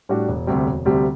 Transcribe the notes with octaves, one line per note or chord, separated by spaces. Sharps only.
A2 G3 D4 F#4
E1
D2 C3 G3
E1
D2 C3 G3